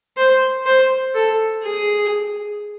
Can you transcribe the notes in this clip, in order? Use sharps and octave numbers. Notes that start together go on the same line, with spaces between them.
C5
C5
A4
G#4